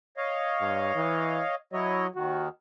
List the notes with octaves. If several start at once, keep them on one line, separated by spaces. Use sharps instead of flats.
C#5 D#5 F5
G2
E3
F#3 E4 C#5 D#5
D#2 D#3 F#4